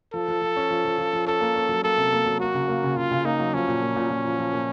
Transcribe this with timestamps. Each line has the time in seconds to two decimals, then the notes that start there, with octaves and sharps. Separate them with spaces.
0.14 F3 A4
0.28 F3
0.42 F3
0.56 C#4
0.70 F3
0.85 F3
0.98 F3
1.13 F3
1.26 C#4 A4
1.41 A#3
1.56 C#4
1.69 F#3
1.83 A#3 A4
1.97 C3
2.12 A#3
2.26 F#3
2.40 A#3 F#4
2.55 C#3
2.68 A#3
2.83 C#3
2.97 C#3 F4
3.11 C#3
3.25 A#3 D#4
3.40 F#3
3.54 F3 C#4
3.68 A#2
3.82 A#2
3.96 A#2
4.10 A#2
4.25 F3
4.38 F3
4.53 A#2